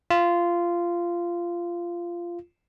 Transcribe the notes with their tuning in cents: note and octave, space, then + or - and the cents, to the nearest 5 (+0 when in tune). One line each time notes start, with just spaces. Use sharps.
F4 -15